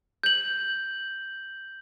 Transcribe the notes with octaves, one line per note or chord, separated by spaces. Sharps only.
G6 F#7